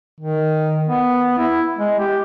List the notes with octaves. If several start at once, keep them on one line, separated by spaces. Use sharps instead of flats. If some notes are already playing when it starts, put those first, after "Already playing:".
D#3
B3
E4
G#3
G4